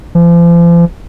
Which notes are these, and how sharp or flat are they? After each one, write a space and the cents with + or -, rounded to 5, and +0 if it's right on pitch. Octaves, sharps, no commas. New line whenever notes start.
F3 -40